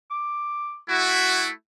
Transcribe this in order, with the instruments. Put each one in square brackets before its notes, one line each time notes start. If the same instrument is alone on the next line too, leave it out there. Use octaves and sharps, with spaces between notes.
[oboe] D6
[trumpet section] A3 E4 [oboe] F#4